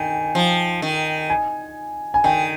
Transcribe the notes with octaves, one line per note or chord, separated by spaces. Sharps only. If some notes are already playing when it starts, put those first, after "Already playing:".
Already playing: D#3 G5 G#5
F3
D#3
G#5
G#5
D#3 G5